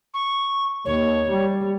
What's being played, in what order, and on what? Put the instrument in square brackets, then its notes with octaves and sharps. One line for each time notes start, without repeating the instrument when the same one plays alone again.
[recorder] C#6
[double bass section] D#2 [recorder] C#5
[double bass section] G3